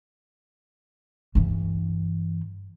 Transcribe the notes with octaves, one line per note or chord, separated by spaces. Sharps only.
G2 E3